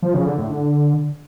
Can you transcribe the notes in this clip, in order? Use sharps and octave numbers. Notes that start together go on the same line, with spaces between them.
F3
C#3
D3
A2
D3